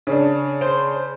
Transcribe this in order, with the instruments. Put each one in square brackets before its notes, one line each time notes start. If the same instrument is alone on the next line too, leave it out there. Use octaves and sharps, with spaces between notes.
[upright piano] C#3 D4
[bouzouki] C5